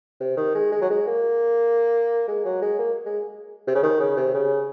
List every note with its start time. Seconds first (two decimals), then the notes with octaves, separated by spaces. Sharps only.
0.20 C3
0.37 D#3
0.55 G#3
0.72 G#3
0.81 F#3
0.90 G#3
1.07 A#3
2.28 G#3
2.45 F#3
2.62 G#3
2.79 A#3
3.06 G#3
3.67 C3
3.75 C#3
3.83 D#3
4.00 C#3
4.17 C3
4.34 C#3